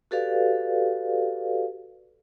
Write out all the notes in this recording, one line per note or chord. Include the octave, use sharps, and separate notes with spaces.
F#4 G4 A4 B4 D5 F5